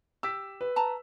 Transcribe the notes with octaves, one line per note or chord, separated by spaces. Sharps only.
G4 E6 B6
B4
A5 A#5